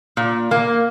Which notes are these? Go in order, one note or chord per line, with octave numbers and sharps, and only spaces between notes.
A#2
A#3